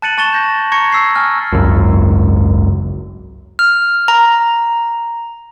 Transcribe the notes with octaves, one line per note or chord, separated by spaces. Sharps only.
A5 F#6 A6 C#7 D#7 F#7
A5 C#6 A6 E7 G7
G6 A#6
A#5 C#6 G#6 A#6 C#7
E6 B6 C7
G#5 F6
G#1 C#2 F#2
F6
A#5